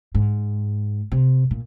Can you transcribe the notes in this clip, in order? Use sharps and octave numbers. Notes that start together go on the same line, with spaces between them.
G#2
C3
A#2